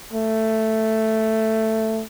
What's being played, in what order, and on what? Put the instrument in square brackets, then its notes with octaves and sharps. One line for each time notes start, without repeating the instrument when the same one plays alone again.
[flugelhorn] A3